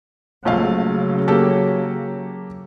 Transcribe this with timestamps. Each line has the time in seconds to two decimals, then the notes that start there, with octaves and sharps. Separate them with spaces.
0.45 A#1 C#3 F#3 A3 F5
1.28 A#3 G4 A4